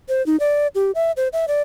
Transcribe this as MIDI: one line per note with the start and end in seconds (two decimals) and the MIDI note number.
0.09 0.24 72
0.26 0.39 63
0.40 0.67 74
0.75 0.91 67
0.95 1.12 76
1.17 1.28 72
1.33 1.46 76
1.48 1.62 74